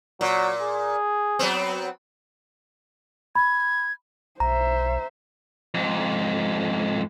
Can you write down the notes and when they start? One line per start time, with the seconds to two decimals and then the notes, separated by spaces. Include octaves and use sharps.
0.21 A#2 F#3
0.62 G#4
1.39 F#3 B3 C4
3.35 B5 G#6
4.40 B1 C5 E5 A#5
5.74 F2 G#2